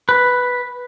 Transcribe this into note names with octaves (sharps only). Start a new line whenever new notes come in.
B4